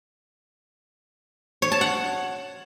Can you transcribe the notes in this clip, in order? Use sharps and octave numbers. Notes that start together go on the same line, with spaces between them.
C#5
A5
F#5